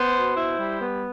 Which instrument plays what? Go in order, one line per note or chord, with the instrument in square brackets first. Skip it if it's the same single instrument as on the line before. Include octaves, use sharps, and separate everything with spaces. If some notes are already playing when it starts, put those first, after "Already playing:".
Already playing: [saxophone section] B3 [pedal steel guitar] C5
[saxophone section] B2
E4
G3
B3